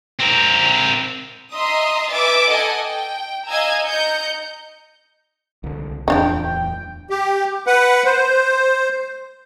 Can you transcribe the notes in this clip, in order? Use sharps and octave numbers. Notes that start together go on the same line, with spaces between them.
C4 A#4
D#5 E5 A#5 C6 D#6
B4 E5 G#5 D6 A6
A4 D#5 F#5 G#5
G5
D#5 F5 G#5 A#5 E6 G#6
D#5 A#5 G6 C#7
C2 D3
D1 E2 E3 F3 D4 D#4 G5
G5
G4
B4 F#5
C5